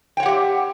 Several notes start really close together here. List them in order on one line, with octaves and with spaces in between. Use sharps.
G5 C#5 F#5 G4 E5